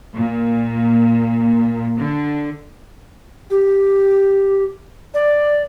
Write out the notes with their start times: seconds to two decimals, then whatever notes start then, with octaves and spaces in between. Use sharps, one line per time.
0.15 A#2
1.97 D3
3.50 G4
5.14 D5